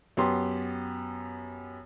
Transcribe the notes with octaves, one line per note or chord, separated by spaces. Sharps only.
F#2 B3 G4 C6